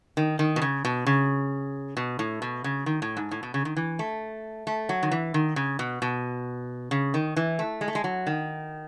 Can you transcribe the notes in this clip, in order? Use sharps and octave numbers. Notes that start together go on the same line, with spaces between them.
D#3
D#3
B2
C#3
B2
C#3
B2
A2
B2
C#3
D#3
A2
G#2
A2
B2
C#3
D#3
E3
A3
A3
F#3
D#3
E3
D#3
C#3
B2
B2
C#3
D#3
E3
A3
G#3
A3
G#3
F#3
D#3